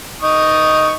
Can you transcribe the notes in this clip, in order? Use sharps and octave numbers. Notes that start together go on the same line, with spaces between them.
D#4 C#6 D#6